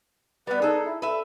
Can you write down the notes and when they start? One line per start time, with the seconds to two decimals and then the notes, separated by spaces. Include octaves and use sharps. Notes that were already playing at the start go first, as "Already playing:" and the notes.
0.47 G3 B3 B4
0.62 D#4 G#4 A4
0.84 E4
1.02 A4 B4 E5